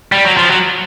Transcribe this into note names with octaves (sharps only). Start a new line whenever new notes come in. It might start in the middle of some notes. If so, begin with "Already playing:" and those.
G3
F#3
F3
F#3